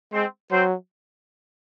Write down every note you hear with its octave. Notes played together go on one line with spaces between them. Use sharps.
G#3 C4 C5
F#3 C4 C5